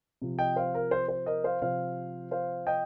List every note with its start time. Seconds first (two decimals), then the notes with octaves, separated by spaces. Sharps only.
0.22 C3 F3
0.39 D#5 G5
0.56 C5 F5
0.74 A#4
0.91 C5
1.09 C5
1.26 A#4 D#5
1.44 C5 F5
1.62 C3 F3 C5 F5
2.31 C5 F5
2.67 D#5 G5